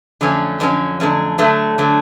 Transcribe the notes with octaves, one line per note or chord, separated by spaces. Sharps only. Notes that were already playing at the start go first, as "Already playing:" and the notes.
F2 D3 F#3 A3 C#4
F2 D3 F#3 A3 C#4
F2 D3 F#3 A3 C#4
D3 F#3 A3
D3 F#3 A3